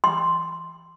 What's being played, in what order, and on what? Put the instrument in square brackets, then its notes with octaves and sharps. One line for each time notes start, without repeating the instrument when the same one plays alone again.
[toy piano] C6